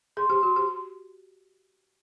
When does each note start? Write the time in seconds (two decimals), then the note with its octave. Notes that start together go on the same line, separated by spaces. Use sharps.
0.17 G#4 C6
0.30 G4
0.43 F#4
0.56 G4